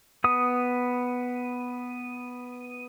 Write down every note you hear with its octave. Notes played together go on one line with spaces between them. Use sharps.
B3 D#6